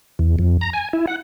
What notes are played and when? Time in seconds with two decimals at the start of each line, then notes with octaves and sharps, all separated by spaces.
0.19 E2
0.39 F2
0.61 A#5
0.73 G#5
0.93 E4
1.07 F#5